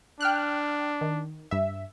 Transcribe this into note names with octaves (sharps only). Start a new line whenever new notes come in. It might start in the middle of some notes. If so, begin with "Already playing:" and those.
D4 G5 F6 F#6
D#3
G2 E5